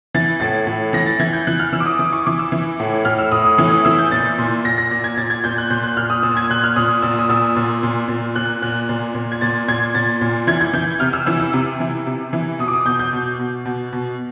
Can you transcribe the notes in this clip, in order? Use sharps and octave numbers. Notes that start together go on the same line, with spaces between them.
E3 A6
A2 A6
A2
E3 A#6
A6
E3 G#6
G6
E3 F#6
F6
E3 E6
D6
D#6
E3 D6
C#6
E3 D6
E6
E3
A2
A2 F6
E6
A2 D#6
D#6
E3 D#6
D#6
E3 E6
G6
A#2 A6
A#2
A#2 A#6
A#6
A#2
G#6
A#2 A6
G#6
A#2 G6
F#6
A#2 G6
F#6
A#2 F6
D#6
A#2 E6
G#6
A#2 F#6
F6
A#2 D#6
A#2 E6
D#6
A#2 E6
A#2
A#2
A#2
A#2 F#6
A#2 F#6
A#2
A#2
G#6
A#2 A6
A#2 G#6
A#2 A6
A#2
E3 G#6
G#6
E3 G6
C3 F6
E6
E3 E6
E6
C3
E3
C3
E3
B2 D#6
D6
D#6
B2 G6
G6
B2
B2
B2
B2